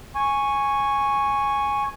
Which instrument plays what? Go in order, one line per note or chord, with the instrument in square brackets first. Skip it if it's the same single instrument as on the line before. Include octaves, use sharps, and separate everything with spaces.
[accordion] G#5 C#6